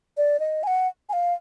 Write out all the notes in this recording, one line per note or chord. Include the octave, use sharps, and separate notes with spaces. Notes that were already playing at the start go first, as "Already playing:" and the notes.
D5
D#5
G#5
F#5
G#5
F5